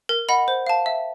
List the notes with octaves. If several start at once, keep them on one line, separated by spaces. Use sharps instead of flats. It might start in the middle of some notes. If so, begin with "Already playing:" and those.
A#4
D#5 F#5 B5
C5
F5 A5
E5